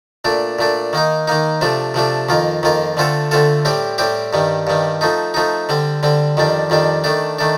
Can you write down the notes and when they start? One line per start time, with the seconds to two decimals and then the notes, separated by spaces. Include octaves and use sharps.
0.25 A#2 A3 D4
0.59 A#2 A3 D4
0.93 D#3 A#3 D#4
1.28 D#3 A#3 D#4
1.61 C3 F3 A3 D4
1.94 C3 F3 A3 D4
2.29 F2 D#3 A#3 F4
2.63 F2 D#3 A#3 F4
2.97 D3 A3 C4 F4 A4
3.31 D3 A3 C4 F4 A4
3.65 A2 G3 C4 G4
3.98 A2 G3 C4 G4
4.33 G2 D#3 G3
4.67 G2 D#3 G3
5.01 F3 A3 D#4
5.34 F3 A3 D#4
5.69 D3 G3 C4
6.03 D3 G3 C4
6.37 F2 D#3 G3 D4
6.70 F2 D#3 G3 D4
7.04 D#3 A3 D4
7.39 D#3 A3 D4